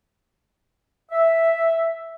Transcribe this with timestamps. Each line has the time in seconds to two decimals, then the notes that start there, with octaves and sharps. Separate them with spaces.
1.12 E5